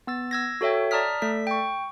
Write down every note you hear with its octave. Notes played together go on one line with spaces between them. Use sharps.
B3 E6 A6
E6 G#6 A#6
F#4 A4 C#5 E5 G5
D5 A5 A#5 D#6 F6 B6
A3 A4 D5 B6
G5 C#6